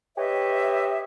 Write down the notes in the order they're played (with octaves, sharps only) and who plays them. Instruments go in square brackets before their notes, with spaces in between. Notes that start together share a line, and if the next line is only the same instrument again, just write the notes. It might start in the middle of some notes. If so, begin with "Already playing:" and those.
[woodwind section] G4 B4 C#5 D#5 E5